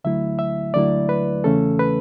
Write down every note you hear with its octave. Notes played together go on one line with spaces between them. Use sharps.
D2 D3 F#3 A3 E4 E5
E5
D2 D3 F#3 A3 E4 D5
B4
E2 C#3 E3 A3 C#4 A4
B4